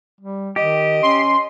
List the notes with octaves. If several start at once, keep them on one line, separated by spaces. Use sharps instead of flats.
G3
D#3 G4 D#5
C#4 C6